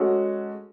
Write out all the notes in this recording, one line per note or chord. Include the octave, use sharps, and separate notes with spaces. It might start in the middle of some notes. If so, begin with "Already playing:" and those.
Already playing: G#3 C#4 F#4 A4